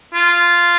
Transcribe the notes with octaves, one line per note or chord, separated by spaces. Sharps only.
F4